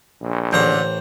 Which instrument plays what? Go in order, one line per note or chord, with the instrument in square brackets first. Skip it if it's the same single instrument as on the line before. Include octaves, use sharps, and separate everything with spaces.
[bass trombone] A#1
[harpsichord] A1 A#5 [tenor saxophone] D3 [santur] C5